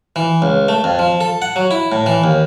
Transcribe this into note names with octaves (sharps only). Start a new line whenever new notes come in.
E3
C#2
A3
F2
F3
A4
F#5
F#3
E4
A2
E3
D#2